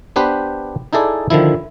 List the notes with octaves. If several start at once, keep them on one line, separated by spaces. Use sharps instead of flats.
B3 D4 G4 B4 C5
D#4 E4 G#4 A4 D5
D3 D#3 F3 E4